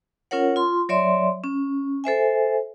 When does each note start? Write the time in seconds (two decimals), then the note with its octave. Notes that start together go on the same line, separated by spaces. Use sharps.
0.31 C#4 F4 A#4 C#5 F#5
0.56 F4 C6
0.89 F#3 C#5 D5 E5 C6
1.44 C#4
2.04 A4 C5 E5 G#5